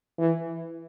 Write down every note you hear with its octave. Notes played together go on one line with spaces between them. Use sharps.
E3